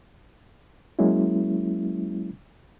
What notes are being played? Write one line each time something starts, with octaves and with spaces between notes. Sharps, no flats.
F#3 G#3 A#3 C#4 E4